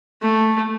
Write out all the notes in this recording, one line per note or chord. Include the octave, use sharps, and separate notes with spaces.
A3